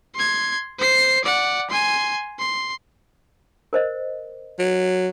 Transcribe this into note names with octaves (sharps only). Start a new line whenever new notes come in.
C6 G#6
C5 C7
D5 F#5
G#5 C6
C6
A#4 C5 D#5
F#3